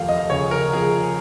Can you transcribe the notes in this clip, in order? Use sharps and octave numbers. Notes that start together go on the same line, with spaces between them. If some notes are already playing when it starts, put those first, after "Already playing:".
Already playing: F1 D#2 F3 F5
D#5
C#3 C#5
A#4
F3 G#4